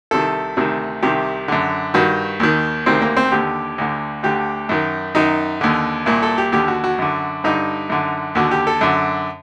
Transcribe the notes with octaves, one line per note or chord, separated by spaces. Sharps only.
C2 C3 D#3 A4
D2 C3 D#3
C2 C3 D#3 G4
F#2 D3
G2 D#3 F#4
D#2 D#3
D2 C3 D#3 C4
A#3
C4
D#2 D3 G4
D2 D3
D2 D3 G4
F#2 D#3
F#2 D#3 D#4
D#2 D3
C2 A#2
A4
G4
D#2 D3 G4
F#4
F#4
F#2 D3
G2 D3 D#4
F#2 D3
D#2 D3 F#4
G4
A4
F#2 D3